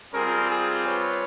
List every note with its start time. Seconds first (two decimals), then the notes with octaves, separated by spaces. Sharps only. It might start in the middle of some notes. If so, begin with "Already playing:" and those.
0.13 G3 C4 F4 G#4 A#4
0.49 G#4
0.86 B4 C#5